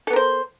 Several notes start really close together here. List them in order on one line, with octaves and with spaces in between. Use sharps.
A4 B3 A#4 C5